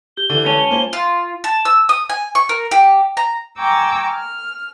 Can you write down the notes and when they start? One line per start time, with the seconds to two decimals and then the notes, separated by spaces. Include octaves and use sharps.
0.17 G4 G7
0.30 D3 E3
0.46 G#3 C#4 A5
0.71 A#3 F4 C5
0.93 F4
1.44 A5
1.65 E6
1.89 D#6
2.09 G#5
2.35 C#6
2.49 A#4
2.71 G4
3.17 A#5
3.59 G5 G#5 A#5 C#6 D6 E6
4.10 F6